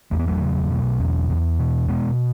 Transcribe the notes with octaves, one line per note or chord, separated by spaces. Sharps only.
E2 A3
B3
F#3 A3
C#3
B2
E2
E2
B2
B2 G#3 B3